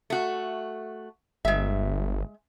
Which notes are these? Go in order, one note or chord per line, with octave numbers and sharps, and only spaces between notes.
A3 F#4
G1 G#3 E5